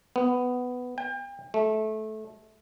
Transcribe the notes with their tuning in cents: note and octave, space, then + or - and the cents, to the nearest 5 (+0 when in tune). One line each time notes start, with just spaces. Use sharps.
B3 +10
G5 +35
A3 -20